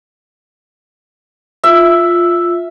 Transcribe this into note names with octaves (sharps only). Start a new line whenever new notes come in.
F4 E5 E6